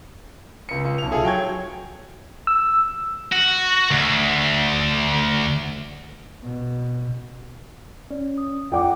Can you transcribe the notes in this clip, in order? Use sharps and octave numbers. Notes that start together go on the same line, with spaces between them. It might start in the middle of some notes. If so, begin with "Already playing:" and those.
C#2 C#7
C#2
B1 F7
F4 G#4 A4 E5
F#3 G5 C#6 G#6
E6
F#4
D2
B2
C#4 D5
D#6
F2 F4 D5 F#5 G5 D6